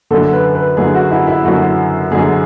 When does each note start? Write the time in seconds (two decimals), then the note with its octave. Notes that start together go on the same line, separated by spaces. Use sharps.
0.11 F#2 D3 A4
0.33 B4
0.55 B4
0.77 F#2 D3 G#4
0.95 F#4
1.11 E4
1.27 E4
1.45 F#2 D3 F#4
2.12 F#2 D3 G#4